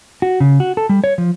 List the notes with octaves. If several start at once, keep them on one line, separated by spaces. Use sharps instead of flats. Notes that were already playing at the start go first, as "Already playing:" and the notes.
F#4
C#3
F#4
A4
G3
C#5
F3